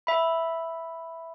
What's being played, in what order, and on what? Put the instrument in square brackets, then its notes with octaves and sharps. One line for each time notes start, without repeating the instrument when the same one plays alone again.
[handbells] E5 B5